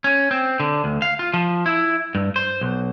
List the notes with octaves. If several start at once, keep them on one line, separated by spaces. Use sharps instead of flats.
C#4
C4
D3
D2
F5
F4
F3
E4
G2
C5
B1